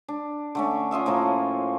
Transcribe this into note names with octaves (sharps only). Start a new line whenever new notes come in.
D4
D3 A3 C#4
C#4 F4 D#5 E5
A2 F3 A#3 D#5